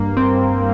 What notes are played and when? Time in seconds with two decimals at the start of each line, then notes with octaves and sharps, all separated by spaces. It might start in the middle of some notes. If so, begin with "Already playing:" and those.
Already playing: G2 A#3
0.17 C4